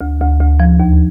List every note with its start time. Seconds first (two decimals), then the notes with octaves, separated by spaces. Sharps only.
0.01 D2
0.20 D2
0.40 D2
0.60 F3
0.80 D#2